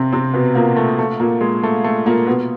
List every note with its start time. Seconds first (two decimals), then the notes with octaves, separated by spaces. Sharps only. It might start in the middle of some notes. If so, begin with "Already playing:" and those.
Already playing: C3 C4
0.13 C3 C4
0.34 B2 B3
0.55 A#2 A#3
0.76 A3
0.99 A3
1.20 A#2 A#3
1.41 G#3
1.63 A3
1.84 A3
2.06 A#2 A#3
2.27 B2 B3